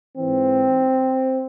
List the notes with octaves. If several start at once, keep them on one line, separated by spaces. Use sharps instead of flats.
G#2 E3 C4